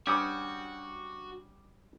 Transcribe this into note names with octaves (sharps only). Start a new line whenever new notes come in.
G3 C#4 D4 F#4 G4 D6 D#6